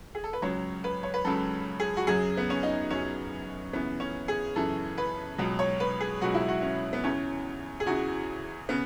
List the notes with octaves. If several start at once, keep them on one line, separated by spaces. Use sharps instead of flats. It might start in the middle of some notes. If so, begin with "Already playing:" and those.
G#4
A4
B4
C#2 C#3 F#3 C#5
B4
C#5
B4
C#2 C#3 F#3 A4
G#4
F#4
F#2 C#3 F#3 G#4
B3
C#4
D#4
F#2 C#3 F#3 C#4
F#2 C#3 E3 B3
C#4
G#4
F#2 C#3 E3 A4
B4
C#2 B2 F#3
C#5
B4
G#4
C#2 B2 F#3 F#4
E4
F#4
C#4
B3
E2 C#3 E3 C#4
G#4
E2 C#3 E3 F#4
C#3 B3